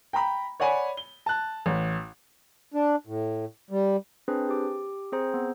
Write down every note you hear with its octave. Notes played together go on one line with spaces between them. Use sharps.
G5 A#5 B5
C#5 D5 F#5 G#5 B5
G7
A5 F#6
A1
D4
A2
G3
C4 D4 G#4 B4 C5
G4 D6
C4 G#4 C5 A#5
B3